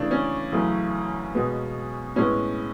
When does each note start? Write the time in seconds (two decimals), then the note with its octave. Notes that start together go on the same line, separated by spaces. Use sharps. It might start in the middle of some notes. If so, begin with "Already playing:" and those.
Already playing: C#3 E3 A3 D4
0.11 C#4
0.52 F#2 C#3 E3 A3
1.34 B2 G#3 B3
2.16 A2 G#3 B3 C#4